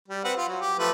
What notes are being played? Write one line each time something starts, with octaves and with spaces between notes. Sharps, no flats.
G3
C4 B4 F#5
F4
F#3
G4
F3 A3 B4